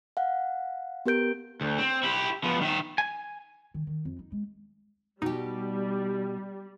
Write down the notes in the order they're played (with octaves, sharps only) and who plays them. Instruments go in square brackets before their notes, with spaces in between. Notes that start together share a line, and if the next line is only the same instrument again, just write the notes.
[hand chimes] F5 F#5
B3 G4 A#4 G6 D7
[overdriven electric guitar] D2
C4
E4 G4
F3 B3
D#3 E5
[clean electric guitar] G#5
[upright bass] D#3
D#3
F2
D#4
G#3
[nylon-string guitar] B2 G4 [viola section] G3 [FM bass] D#4